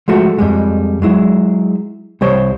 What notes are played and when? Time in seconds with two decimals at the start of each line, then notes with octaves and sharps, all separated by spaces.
0.08 F3 G#3 A3 F#4
0.38 F2 G3 G#3
1.02 F#3 G#3 E4
2.21 C2 G3 C5 C#5